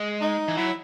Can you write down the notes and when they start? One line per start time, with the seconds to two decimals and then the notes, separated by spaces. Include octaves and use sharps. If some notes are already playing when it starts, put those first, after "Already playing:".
Already playing: G#3
0.21 D#4
0.48 E3
0.57 F#3 E4